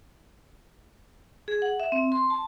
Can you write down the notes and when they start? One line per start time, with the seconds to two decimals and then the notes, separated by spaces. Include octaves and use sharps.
1.48 G#4
1.62 F#5
1.80 E5
1.92 C4
2.12 C6
2.30 A5